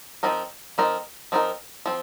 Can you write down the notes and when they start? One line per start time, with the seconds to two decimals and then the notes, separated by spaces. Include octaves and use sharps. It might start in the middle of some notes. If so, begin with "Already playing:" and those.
0.23 F3 C4 D#4 A#4
0.78 F3 C4 D#4 A#4
1.32 F3 C4 D#4 A#4
1.86 F3 C4